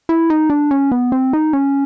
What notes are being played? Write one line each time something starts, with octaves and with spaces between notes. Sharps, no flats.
E4
D#4
D4
C#4
B3
C4
D#4
C#4